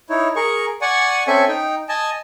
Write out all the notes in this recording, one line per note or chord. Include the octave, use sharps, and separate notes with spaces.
D#4 E4 C#5
G#4 A#4 C#6
D5 F#5 G#5 C#6
C4 C#4 A4 E5 G#5 C#6
D#4 G5
D#5 G#5 A5